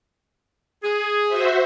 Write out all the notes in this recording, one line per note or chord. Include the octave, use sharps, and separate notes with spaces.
G#4
F#4 C5 E5